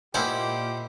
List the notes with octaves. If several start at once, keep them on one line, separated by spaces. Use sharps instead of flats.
A#2 G#3 A#3 E4 G4 C5 F#5